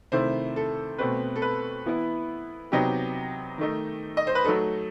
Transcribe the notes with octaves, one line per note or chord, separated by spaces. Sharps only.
C3 D#3 A3 E4 C5
A4
B2 A3 C4 B4
A4
B4
E3 B3 E4
C3 F#3 B3 D#4 G4
D#3 A3 D#4
D#5
C5
B4
F#3 A3 D#4 A4